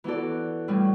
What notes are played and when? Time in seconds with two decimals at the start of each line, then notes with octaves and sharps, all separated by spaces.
0.04 E3 B3 F#4 A4 D5
0.68 A2 G3 C#4